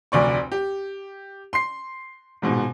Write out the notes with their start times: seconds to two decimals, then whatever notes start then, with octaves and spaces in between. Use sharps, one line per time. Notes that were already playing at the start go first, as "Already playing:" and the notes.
0.12 F1 D2 D5 C#6
0.52 G4
1.53 C6 C7
2.42 D#1 G#2 B2